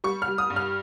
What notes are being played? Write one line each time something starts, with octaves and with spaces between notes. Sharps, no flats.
G3 C#6
F6
G3
D#6
G2
F6